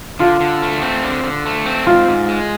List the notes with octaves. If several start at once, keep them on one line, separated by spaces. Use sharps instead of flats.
D3 F4
D3
A3
C4
D3
D3
A3
C4
G#2 F4
G#2
G#3